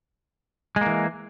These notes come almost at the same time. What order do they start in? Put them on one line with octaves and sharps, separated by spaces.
G#3 A#3 E3